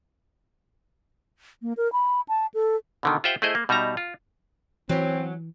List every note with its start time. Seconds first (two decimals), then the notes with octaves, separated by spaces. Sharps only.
1.62 A#3
1.77 A#4
1.92 B5
2.28 A5
2.54 A4
3.03 B2 D3 D#3
3.24 F4 G4 C5 E5 F#5 G5
3.42 A3 E4 G#4 C5 D#5
3.55 A#3
3.69 B2 G3 D#4 E5 A#5
3.97 F4
4.89 E3 F#3 C4 C#4